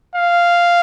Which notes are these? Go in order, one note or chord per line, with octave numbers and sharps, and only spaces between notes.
F5